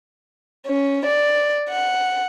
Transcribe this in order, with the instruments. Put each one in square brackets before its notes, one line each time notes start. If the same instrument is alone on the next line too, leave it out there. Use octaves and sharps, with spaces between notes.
[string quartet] C#4
D5
F#5